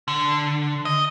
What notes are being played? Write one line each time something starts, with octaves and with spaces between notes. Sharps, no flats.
D3
D#5